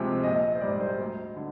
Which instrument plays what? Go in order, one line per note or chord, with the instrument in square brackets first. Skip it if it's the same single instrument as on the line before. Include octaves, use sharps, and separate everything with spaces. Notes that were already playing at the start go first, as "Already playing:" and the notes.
Already playing: [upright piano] D2 C3 F3 G#3 C4
A#1 D#5
C5
G#2 G3 D5
C5
D2
D3